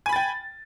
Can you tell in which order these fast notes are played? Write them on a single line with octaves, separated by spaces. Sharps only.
G#5 B5 A6 G5